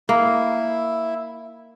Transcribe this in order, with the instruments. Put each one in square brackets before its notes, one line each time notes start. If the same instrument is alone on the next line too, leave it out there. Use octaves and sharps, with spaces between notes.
[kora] A#3 [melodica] E4